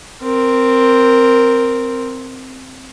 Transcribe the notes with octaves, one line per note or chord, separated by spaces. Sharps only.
C4 A#4